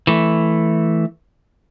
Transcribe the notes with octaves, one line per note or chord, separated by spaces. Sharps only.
E3 A3